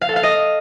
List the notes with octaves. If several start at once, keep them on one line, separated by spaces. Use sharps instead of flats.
F5
A4
F5
D#5